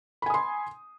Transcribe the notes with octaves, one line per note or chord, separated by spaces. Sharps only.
G#5 B5 C6 D#6